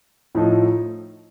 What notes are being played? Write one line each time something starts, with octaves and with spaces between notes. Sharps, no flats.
A2 F3 A3 D#4